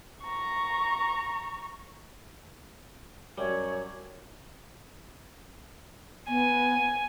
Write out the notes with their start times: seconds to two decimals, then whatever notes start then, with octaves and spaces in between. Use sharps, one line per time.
0.22 A#5 C#6
3.38 F#2 G3 C#5
6.28 B3 G#5